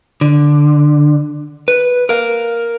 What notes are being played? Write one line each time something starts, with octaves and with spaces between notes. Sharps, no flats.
D3
B4
A#4 F5